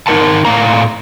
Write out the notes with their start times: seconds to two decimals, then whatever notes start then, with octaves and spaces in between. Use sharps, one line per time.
0.07 D#4 G4 A#4 F#5 A5
0.45 A2 F5 A#5